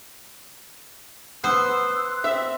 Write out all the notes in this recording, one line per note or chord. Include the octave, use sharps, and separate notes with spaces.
B3 C5 C6 E6 F#6
C4 E5